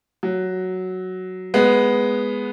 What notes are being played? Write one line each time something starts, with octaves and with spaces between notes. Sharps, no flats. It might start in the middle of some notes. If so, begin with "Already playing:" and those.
F#3
G#3 B3